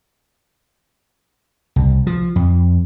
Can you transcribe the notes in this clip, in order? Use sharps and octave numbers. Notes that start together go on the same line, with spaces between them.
C2
F3
F2